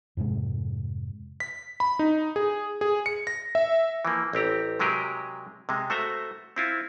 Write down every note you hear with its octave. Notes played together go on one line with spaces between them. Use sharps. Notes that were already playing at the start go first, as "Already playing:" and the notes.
F2 G#2 C3 G#3
B6
B5
D#4
G#4
G#4
C#7
A#6
E5
E3 F3 A#3
A1 C4 G4 A#5
C3 F#3 G#3 G4 G#4 A#4
C3 G#3
A3 F#4 C5 E5 A#5
C4 E4 F4